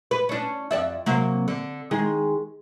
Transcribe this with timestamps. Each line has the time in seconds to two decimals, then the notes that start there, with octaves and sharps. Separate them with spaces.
0.11 B4
0.29 C#4 D4
0.71 F2 D5 E5
1.06 C3 F#3 A#3
1.48 D3
1.91 D#3 G#3 G#4